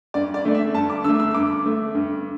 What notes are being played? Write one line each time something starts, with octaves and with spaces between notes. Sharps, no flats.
G2 D5
D5
D3 A3 D5
E5
G2 A5
D6
D3 A3 E6
E6
G2 D6
D3 A3
G2